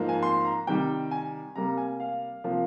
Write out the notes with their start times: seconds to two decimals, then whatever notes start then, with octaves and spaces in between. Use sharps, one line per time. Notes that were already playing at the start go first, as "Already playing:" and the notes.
Already playing: G#2 F3 A#3
0.09 G#5
0.23 C6
0.45 A#5
0.67 C3 D#3 G3 G5
1.11 G#5
1.56 C3 G3 A#3 A#5
1.78 G#5
2.00 F5
2.44 C3 F3 A#3